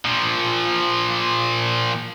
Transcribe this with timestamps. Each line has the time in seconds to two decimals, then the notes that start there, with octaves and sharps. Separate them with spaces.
0.05 A#2 F3